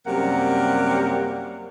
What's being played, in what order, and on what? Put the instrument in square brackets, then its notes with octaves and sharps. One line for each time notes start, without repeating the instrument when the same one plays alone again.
[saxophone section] F#2 C3 G3 A#3 A#4 F#5